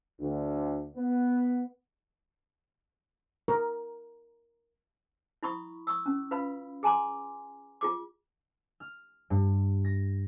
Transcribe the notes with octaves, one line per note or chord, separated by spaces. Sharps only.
D2
B3
A#4
E4 B5 C#6 D#6
C#6 D#6 E6
C#4
F4 B4 F5 B5
G#4 G#5 A#5 C6 D6
F4 G#4 D6
F6
G2
A#6